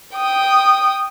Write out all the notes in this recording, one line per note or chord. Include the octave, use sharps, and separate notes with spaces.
G5 D#6